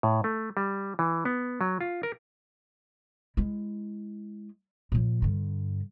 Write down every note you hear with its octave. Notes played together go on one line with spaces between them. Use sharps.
A2
A3
G3
E3
B3
F#3
F4
A#4
G#3 E4
A#2 F3
G2 D3